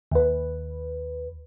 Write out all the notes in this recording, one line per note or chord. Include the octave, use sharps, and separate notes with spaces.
D#2 B4